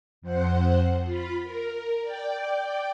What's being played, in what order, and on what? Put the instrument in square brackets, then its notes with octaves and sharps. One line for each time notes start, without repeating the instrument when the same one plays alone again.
[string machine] F2 C5 F#5
F4 B5
A#4
D5 G5
D5 G5